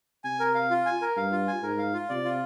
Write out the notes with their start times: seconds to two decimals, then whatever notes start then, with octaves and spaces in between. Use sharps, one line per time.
0.24 C3 G#5
0.40 A#4
0.55 F5
0.71 F4
0.86 G#5
1.02 A#4
1.16 G2 F5
1.32 F4
1.48 G#5
1.62 G#2 A#4
1.78 F5
1.94 F4
2.09 C3 D5
2.25 F4